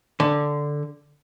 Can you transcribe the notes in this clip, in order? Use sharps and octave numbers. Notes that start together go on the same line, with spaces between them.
D3